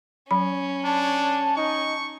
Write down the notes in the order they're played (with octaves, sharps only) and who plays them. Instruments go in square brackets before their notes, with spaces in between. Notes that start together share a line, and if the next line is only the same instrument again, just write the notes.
[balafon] F#3 B5 [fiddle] C#4
[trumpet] D4 [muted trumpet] A5
[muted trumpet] D#4 [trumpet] C#6